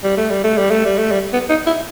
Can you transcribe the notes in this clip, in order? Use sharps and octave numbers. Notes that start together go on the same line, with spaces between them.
G3
A3
G3
A3
G3
A3
G3
A3
G3
B3
D#4
E4